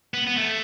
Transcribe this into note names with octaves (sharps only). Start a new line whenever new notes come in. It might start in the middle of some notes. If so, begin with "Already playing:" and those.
B3
B3
A3